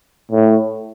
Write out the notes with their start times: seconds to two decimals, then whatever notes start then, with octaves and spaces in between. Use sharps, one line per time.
0.32 A2